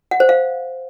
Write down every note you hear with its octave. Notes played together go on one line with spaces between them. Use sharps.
F#5
C5
F5